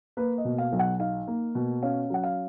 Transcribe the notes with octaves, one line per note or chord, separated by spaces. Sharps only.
A#3 B4
D#5
B2
F5
B1
F#5
D#4 F5
A#3
B2
C#4 F5
F#3 F#5
F5